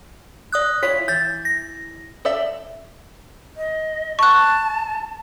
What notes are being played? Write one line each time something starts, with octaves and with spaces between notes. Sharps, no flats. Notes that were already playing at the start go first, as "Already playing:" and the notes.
D5 D#6 F#6
E4 F4 C#5 B6
E3 G6 A6
A#6
A4 D5 E5
D#5
A5 C#6 F#6